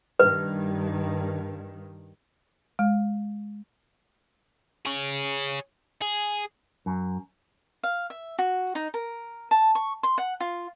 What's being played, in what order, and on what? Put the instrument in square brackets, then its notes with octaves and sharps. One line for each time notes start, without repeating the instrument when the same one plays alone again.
[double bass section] G2 D#3 [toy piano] B4
[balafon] G#3
[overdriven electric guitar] G#4 C#5
G#4
[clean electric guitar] F#2
[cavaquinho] F5
E5
F#4
D#4
A#4
A5
C#6
C6
F#5
F4